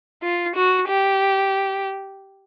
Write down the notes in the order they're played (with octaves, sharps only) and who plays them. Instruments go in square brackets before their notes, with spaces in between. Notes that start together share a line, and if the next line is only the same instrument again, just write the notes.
[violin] F4
F#4
G4